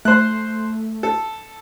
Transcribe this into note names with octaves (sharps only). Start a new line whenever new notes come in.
A3 C5 F#6
A4